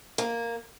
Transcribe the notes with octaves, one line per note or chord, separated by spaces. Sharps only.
A#3